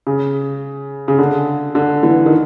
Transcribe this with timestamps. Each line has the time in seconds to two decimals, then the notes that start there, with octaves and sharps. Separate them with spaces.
0.07 C#3
1.08 C#3
1.19 D3
1.75 D3
2.03 D3 E3
2.26 D#3